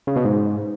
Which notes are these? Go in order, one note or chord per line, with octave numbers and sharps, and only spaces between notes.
C#3
B2
G#2